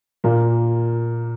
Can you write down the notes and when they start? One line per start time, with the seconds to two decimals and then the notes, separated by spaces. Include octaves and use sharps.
0.24 A#2 A#3